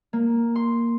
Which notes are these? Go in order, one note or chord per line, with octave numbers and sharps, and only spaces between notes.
A#3
C6